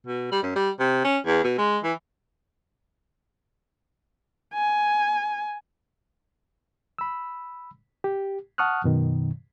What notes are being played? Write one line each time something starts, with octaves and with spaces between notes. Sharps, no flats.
B2
G3
F#2
G3
C3
C#4
E2
B2
G#3
E3
G#5
B5 E6
G4
F#5 A5 C#6 D#6 F6 F#6
F#2 B2 D#3